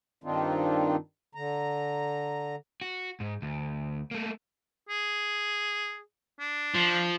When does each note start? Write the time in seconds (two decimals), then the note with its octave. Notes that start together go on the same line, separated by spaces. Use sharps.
0.24 G2 D#3 C4 D4 D#4 F4
1.35 D3 A#5
2.81 F#4
3.20 G#2
3.42 D2
4.11 A3 A#3
4.89 G#4
6.40 D4
6.75 F3